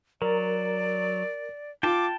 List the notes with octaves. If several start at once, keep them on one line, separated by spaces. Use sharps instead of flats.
F#3 A#4 D5
F4 G5 A5 D6